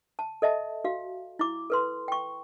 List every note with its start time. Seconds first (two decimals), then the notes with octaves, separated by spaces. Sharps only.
0.19 A5
0.42 A4 D#5 E5 A5
0.84 F#4 F5
1.39 E4 D6
1.70 A4 B4 C6
2.08 G5 C#6